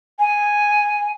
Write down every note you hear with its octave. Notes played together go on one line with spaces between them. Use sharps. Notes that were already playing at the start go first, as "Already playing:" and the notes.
G#5